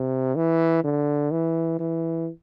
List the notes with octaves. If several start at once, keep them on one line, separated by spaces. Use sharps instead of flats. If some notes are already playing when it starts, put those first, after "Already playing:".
Already playing: C3
E3
D3
E3
E3